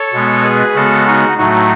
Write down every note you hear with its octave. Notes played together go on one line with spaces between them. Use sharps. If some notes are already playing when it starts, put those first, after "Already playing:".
Already playing: A4 C#5
B2 G#3 B3
G#4 B4
C#3 G#3 B3 F#4 A4
D#4 F#4
A2 F#3 A3 D#4 F#4